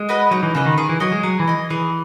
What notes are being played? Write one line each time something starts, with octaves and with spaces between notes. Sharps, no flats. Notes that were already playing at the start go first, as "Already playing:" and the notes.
Already playing: G#3
F#4 B4 D#5
F#3 D#4
E3
C#3 F#4 B4 D#5
D#3
D#3 G#4
E3
F#3 D#5 G#5
G#3
F#3 G#4
E3
D#5 G#5
E3 G#4